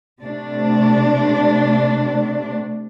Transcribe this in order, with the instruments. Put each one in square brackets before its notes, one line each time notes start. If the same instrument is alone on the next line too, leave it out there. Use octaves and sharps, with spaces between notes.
[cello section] C3 A3 D4